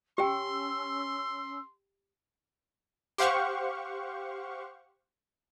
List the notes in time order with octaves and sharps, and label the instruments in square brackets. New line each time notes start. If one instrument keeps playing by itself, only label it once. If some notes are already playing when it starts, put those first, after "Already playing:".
[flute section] C#4 E6 [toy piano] G4 G5 [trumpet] C6
[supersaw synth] G4 C5 F5 F#5 C#6